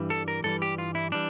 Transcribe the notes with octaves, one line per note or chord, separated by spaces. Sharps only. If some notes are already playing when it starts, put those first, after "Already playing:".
Already playing: G2 E3 G3
A4
A#4
G2 E3 G3 A4
G4
F4
E4
E3 G3 D4